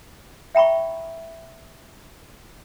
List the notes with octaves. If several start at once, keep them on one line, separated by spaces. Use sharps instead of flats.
E5 G5 A#5 B5 C#6